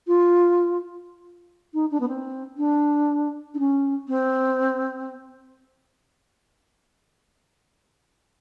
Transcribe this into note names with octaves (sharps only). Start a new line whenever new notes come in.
F4
D#4
D4
B3
C4
D4
D4
C#4
C4